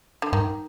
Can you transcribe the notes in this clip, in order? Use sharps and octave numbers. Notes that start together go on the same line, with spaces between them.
D3
G2 D#3